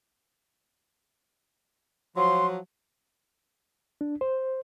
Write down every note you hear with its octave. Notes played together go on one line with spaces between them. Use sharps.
F3 F#3 C6
D4
C5